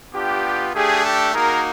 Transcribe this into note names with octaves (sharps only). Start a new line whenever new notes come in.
B3 D4 F4 G4
A3 D4 G4 G#4
G4 A4
A#3 D#4 F#4 G#4 A#4